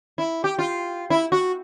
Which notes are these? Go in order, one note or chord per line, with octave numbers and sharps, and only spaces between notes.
E4
G4
F4
E4
F#4